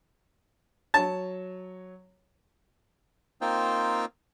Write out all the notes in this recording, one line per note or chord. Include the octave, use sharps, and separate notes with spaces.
F#3 C#5 A5
A#3 C4 D#4 F4 C5 G5